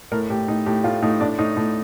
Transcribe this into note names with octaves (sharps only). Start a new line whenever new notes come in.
A2 A#4
A2 G4
A2 D#4
A2 G4
A2 F4
A2 D#4
A2 D4
A2 D#4
A2